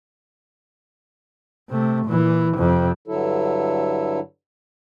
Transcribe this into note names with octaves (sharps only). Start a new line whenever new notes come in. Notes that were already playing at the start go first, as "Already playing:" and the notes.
C3 A3
A#2 E3
F2 C3
G2 D3 F#3 E4 A4